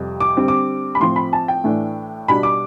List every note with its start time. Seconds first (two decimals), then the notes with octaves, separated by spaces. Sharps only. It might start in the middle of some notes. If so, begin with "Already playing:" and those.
Already playing: F2 C3 G3
0.20 D6
0.37 D3 G3 C4
0.48 D6
0.95 B5
1.00 A2 F3 C4 C6
1.16 B5
1.33 A5
1.48 G5
1.64 A2 E3 A3 D4
2.28 B2 G3 D4 B5
2.43 D6